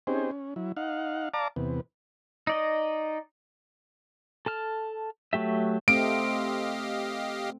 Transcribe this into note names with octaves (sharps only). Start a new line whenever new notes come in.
C4 C#4 D#4 G4 G#4 C5
C#4
F#3 E4
D#4 F5 F#5
D5 F5 A5 A#5 D6
E2 C3 B3
D#4 D5 D#5
A4 A5 F6
F#3 A3 G4 E5
A3 C4 G4 D#5 F5 D7